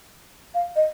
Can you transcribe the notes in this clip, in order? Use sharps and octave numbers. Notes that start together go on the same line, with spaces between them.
F5
D#5